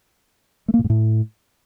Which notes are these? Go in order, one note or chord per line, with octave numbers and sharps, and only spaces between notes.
A3
A#3
A#2
G#2
A2